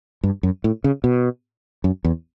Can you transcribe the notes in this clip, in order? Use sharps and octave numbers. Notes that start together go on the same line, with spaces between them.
G2
F#2
A2
C#3
B2
F#2
E2